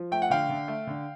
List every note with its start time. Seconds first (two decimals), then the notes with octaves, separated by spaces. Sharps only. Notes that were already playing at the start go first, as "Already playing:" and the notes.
Already playing: F3
0.12 A3 G5
0.22 F#5
0.30 D3 F5 G5
0.50 D3
0.68 A3
0.87 D3